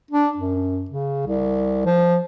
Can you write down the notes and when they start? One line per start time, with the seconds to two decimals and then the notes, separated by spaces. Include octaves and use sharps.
0.11 D4
0.37 F#2
0.90 C#3
1.27 C2
1.86 F3